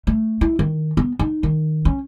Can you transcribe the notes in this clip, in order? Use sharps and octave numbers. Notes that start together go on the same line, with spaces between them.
A3
E4
D#3
B3
D#4
D#3
C#4